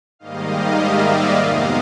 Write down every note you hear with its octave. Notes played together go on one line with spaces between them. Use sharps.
G#2 D#3 G3 A#3 D#5 F5
D5 E5
F2 C3 D#3 F#3 B3 D#5 F5